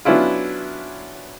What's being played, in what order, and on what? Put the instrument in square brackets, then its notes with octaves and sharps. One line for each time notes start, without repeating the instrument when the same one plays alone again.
[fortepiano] F#3 B3 C#4 D4 E4 F4